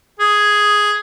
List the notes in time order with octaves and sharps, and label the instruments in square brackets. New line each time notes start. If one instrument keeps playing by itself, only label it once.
[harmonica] G#4